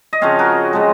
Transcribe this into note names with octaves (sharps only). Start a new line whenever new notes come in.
D#5
C#3 F3 C4 C#5 F5
F#4 A#4
C#3 F3 G#3